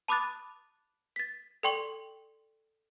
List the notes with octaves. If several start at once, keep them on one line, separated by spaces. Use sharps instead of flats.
A5 B5 D6 D#6 F#6 A6
A6 B6
A4 D5 G5 C6 C#6 F#7